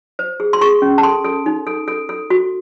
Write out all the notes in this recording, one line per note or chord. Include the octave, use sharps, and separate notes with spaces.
C5
G#4
C6
G#4 C#6
C#4
A5
A4 C6
A4
D#4
A4
A4
A4
F#4